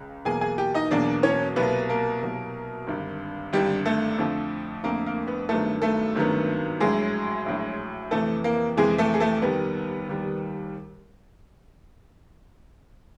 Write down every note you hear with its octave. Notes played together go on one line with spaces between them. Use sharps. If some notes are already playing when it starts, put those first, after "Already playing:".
Already playing: C#2 C#3
E2 B2 F#3 A#3 G#4 G#5
G#4 G#5
G4 G5
D#4 D#5
E2 B2 F#3 A#3 D4 D5
C#4 C#5
C2 B2 F#3 A#3 B3 B4
A#3 A#4
C2 B2 F#3 A#3
G#1 G2 D3
G#1 G2 D3 G3 G4
A3 A4
F2 D3 F3 A3
F2 D3 F3 A3 A#3 A#4
A#3 A#4
B3 B4
G#1 G2 D#3 F#3 A3 B3 A4
A3 A4
G#1 G2 D#3 F#3 B3
A#1 A2 F#3 G#3 G#4
A#1 A2 F#3
F2 C3 E3 A3 A4
A#3 A#4
F2 C3 E3 G#3 G#4
A3 A4
G#4
A3 A4
F1 D#2 D#3 G3 B3 B4
F1 D#2 D#3 G3